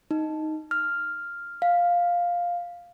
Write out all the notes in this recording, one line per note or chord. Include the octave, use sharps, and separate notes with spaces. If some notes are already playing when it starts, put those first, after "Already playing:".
D#4
F6
F5